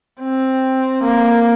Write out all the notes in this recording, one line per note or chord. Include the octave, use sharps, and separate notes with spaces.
C4
A#3